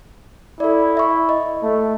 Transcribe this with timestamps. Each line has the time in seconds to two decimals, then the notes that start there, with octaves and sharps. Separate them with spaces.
0.60 E4 A4 D5
0.97 E5 C#6
1.29 D#5
1.63 A3